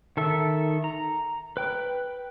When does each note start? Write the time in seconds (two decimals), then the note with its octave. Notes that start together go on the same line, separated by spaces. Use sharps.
0.17 D#3 A4 E5
0.84 A#5
1.57 B4 G5